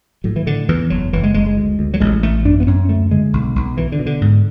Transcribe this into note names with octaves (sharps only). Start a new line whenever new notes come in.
A2 F#3
E3
A2 D3
E2 E3
F#1 F#3
F#1 E3
G#3
F#1 G#3
G#3
D2
D2
F#3
A1 G#3
A1 A3
F#2 D4
B3
F#2 C#4
D2 A3
D3 G#3
B1
B1
B2 E3
D3
B2
D3
G#2